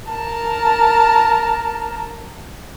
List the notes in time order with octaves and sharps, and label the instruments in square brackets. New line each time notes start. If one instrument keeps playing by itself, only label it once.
[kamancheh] A#4 A5